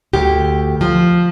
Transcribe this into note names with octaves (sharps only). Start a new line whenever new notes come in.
D2 G4
F3